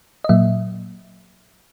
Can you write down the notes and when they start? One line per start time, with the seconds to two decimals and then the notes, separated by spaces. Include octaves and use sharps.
0.24 D#5
0.29 A#2 F#3 A#3 E5